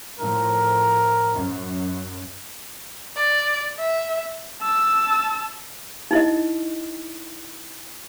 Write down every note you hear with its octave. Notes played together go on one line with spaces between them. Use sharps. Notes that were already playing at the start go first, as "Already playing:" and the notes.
A2 F3 A#4
F#2
D5
E5
A5 E6
D#4 E4 D#5